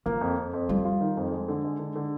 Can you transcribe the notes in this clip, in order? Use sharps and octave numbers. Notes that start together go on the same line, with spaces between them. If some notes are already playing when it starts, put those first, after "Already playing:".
F3 A#3
F2
F2
F2
G3 F4
F4
D#3
F2
G#3
D3
G#3
D3
D3